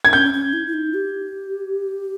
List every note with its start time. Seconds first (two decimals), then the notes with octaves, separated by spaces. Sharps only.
0.05 G#6
0.12 C#4 G6
0.33 C#4
0.53 E4
0.67 E4
0.74 D#4
0.94 G4